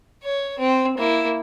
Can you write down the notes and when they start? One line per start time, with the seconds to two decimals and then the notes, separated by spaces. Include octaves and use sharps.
0.24 C#5
0.59 C4
0.97 A#3 E4